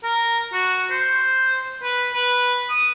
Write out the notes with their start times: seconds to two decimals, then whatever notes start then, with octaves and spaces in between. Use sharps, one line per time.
0.04 A#4
0.53 F#4
0.91 C5
1.83 B4
2.14 B4
2.69 D#6